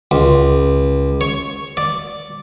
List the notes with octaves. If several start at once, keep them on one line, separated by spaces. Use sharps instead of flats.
C#2
C#5
D5